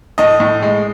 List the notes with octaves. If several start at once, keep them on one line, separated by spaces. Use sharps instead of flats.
A2 D#5
A2
G#3